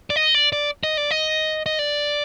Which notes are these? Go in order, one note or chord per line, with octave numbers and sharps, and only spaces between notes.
D5
D#5
D5
D5
D#5
D5
D#5
D#5
D5